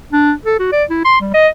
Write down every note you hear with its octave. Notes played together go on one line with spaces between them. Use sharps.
D4
A4
F#4
D5
E4
C6
G3
D#5